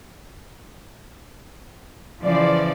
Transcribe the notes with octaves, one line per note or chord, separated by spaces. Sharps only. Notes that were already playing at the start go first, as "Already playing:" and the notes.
C#3 E3 F3 D5